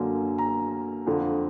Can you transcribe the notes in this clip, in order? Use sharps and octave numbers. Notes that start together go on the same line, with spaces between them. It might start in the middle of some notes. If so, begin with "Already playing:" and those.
Already playing: F#2 D3 F#3 A#3
A#5
F2 D3 F3